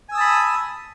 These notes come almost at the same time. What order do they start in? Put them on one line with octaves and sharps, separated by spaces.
G#5 E6 D#6 A5 B5